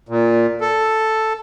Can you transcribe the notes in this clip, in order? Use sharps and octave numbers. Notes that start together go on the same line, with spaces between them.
A#2
A4